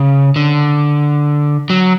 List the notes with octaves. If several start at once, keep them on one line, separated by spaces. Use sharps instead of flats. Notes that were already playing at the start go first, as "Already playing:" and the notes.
Already playing: C#3
D3
F#3